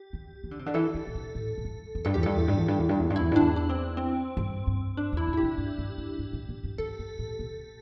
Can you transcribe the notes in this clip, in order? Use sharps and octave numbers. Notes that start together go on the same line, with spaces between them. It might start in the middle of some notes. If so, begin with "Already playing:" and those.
Already playing: G4
D3
E3
D3
C3
D3
E3 A4
D3
A2
C3
A2
A2
G2
E2
G2 A4
E2 G4
G2 A4
E2
G2
E2
G2
E2
G2
E2
G2
E2 E4
G2
E2 D4
D4
C4
C4
G2
G2
D4
E2 E4
A2
E4
G4
C3
G2
G2
E2
G2
A2
C3
G2
E2 A4
G2
A2
C3